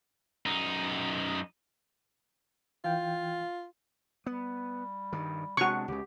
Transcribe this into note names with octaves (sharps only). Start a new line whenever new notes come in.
F#2 D#4
E3 F4 F5 G5
G3 B3
G2 D#3
C3 G#3 D4 F#4 C#6
C#2 C#3 G4